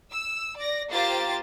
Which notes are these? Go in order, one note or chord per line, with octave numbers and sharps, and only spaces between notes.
E6
D5 A#6
A#3 F4 G4 C5 A6